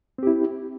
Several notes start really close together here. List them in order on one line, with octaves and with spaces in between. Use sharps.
C4 G4 E4